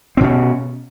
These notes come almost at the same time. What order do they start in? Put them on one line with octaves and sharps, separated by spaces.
C4 B2 C#4